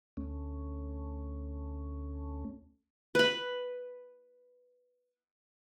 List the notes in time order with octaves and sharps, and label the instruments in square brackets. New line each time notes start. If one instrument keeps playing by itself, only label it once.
[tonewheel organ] D2 A3 C#4
[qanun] B4 B5